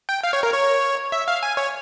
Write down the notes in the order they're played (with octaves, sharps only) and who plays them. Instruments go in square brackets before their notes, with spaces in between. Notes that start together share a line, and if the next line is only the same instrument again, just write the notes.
[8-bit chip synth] G5
F5
C#5
A#4
C#5
E5
F5
G#5
C#5